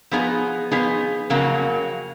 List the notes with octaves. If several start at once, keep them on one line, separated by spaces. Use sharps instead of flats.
F3 B3 D#4 G#4
F3 B3 D#4 G#4
F2 C#3 F#3 A#3